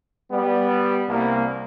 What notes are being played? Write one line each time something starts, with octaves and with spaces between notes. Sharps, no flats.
G3 B3
C2 A#3